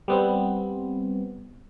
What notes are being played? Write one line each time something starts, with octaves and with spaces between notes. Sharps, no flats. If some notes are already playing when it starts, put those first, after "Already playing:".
G3 B3 C4